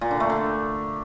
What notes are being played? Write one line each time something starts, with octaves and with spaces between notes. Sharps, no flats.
A#2
D3
A3
D3